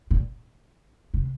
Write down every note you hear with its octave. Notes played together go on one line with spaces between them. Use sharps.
A#2
C3